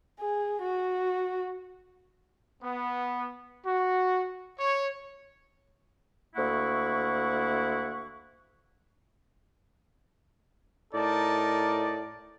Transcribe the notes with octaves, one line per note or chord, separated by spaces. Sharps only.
G#4
F#4
B3
F#4
C#5
D2 A#3 E4 F#5 C#6
A2 D#4 A#4 D5 A5